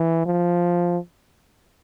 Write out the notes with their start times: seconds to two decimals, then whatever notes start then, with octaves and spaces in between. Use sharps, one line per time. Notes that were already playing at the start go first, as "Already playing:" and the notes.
Already playing: E3
0.26 F3